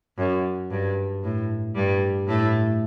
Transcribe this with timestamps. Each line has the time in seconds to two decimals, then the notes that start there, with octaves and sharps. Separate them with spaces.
0.18 F#2
0.71 G2
1.23 A2
1.75 G2 G3
2.27 A2 A3